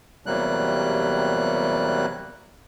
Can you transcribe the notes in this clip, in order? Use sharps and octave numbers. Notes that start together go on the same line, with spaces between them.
E2 C3 F#3 G3 A#3 F#6